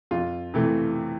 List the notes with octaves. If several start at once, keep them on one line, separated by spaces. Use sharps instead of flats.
F2 F4
C3 E3 A3